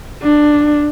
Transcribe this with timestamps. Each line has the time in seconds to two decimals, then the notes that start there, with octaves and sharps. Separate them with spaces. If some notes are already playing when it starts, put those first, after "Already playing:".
0.23 D4